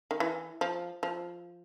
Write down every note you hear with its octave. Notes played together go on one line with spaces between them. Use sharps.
D#3
E3
F3
F3